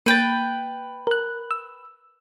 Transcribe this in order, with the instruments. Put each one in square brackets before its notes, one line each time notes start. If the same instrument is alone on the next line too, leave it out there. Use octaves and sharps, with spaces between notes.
[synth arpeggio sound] A#3 A6 [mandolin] B4 G5
[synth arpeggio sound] A#4 F#6
E6